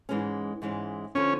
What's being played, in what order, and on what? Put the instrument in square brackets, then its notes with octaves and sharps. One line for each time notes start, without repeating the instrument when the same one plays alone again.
[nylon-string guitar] G#2 E3 G#3 C#4
G#2 E3 G#3 C#4
[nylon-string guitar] D3 F3 [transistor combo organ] C#4